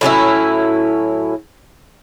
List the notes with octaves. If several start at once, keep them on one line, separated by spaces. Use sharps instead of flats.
A2 F#3 C#4 E4